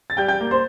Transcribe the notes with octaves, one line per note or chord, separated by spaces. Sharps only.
A6
G3 G5 G6
G5 G6
A#3
C5 C6